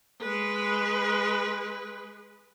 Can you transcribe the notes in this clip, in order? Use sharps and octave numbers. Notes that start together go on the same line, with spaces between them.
G#3 B4